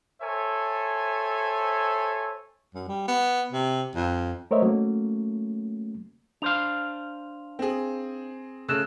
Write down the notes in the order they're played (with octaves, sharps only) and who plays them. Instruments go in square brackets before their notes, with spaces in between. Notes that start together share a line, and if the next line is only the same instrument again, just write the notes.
[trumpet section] A4 C5 C#5 E5 G#5
[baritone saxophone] F#2
G3
B3
C3
F2
[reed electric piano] A3 A#4 C5 C#5 D#5 E5
F#3 A3 A#3 C#4
[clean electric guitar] D4 C5 F5 [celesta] F7
[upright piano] C4 G#4
[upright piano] C#3 A3 [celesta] E6 F#6 E7